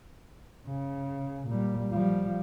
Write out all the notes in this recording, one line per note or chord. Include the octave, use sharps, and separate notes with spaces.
C#3
A#2 G3
F3 G3